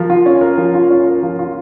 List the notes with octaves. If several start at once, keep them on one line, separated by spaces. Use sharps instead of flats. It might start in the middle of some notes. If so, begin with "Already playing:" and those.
Already playing: F3 A#4
F4
C#4
A#4
F3
F4
C#4
A#4
F3
F4